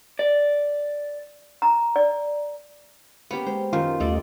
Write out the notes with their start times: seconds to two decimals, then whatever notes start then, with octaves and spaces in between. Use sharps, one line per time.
0.19 D5
1.62 A#5
1.96 D5
3.31 A#3 B3 C#4 G4
3.46 G#3 C5
3.73 F#2 D#3 F4
4.00 D#2 G3 A3 A4 D5 D#5